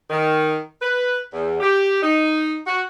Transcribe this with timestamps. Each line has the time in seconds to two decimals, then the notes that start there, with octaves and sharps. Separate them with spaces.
0.10 D#3
0.81 B4
1.33 E2
1.61 G4
2.03 D#4
2.67 F#4